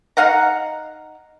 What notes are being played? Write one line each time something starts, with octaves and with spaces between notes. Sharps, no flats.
D#4 F5 F#5 A#5